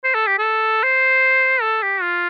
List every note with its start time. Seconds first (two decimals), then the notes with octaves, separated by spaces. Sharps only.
0.04 C5
0.15 A4
0.27 G4
0.38 A4
0.83 C5
1.62 A4
1.83 G4
2.02 F4